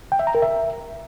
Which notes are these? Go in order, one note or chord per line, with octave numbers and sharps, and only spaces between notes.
G5
E5
A#5
A#4
E5